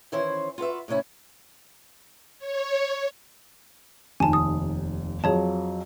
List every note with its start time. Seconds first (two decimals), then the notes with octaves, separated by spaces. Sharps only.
0.12 D#3 E3 C#4 E4 C5
0.58 F4 F#4 B4 E5
0.88 A2 C3 C#4 E4
2.39 C#5
4.20 F1 D#2 G#5 A5
4.33 D#6
5.24 F2 F3 F#3 G#4 C#5 A5